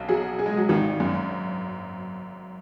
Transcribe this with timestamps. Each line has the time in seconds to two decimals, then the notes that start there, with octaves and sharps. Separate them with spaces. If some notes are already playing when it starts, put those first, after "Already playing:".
Already playing: B1
0.09 F#3 G#4
0.39 G#4
0.46 G#3
0.57 F#3
0.69 G#1 D#3
1.00 F#2